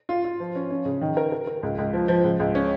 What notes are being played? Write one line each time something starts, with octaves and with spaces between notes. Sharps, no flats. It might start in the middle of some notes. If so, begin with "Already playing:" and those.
F4
F4
F3
C#4
C#4
C#3
D#3
A#4
A#4
A#4
C#2
C#2
F3
F3
C#2
C#2
C#4